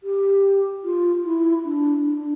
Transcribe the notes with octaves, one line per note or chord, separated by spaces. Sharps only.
G4
F4
E4
D4
D4